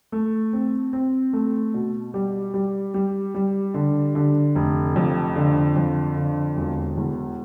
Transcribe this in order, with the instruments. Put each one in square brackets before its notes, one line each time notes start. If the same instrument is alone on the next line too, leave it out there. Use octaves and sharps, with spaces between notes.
[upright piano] A3
C4
C4
A3
B2
G3
G3
G3
G3
D3
D3
F1
F2
D3
F2
D3
E1
E2